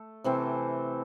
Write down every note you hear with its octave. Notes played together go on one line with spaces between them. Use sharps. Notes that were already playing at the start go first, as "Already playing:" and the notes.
Already playing: A3
C3 E3 A3 C4